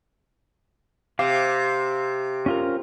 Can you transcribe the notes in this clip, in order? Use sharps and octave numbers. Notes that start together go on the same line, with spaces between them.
C3 F5 D6
C#4 F4 A#4